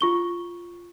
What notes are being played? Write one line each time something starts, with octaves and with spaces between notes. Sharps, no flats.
F4 C#6 G7